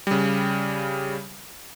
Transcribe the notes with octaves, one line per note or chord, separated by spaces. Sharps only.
C#3 G3